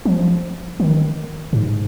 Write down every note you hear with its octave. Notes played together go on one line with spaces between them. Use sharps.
F3
D#3
G#2